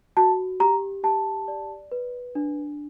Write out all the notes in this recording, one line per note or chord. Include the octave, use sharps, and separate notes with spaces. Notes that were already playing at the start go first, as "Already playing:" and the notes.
F#4 A5
G4 A#5
G4 A5
D5
B4
D4